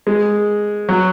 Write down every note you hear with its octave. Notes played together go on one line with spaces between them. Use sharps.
G#3
F#3